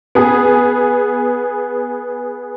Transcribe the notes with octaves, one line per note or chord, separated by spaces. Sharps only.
B3 G#4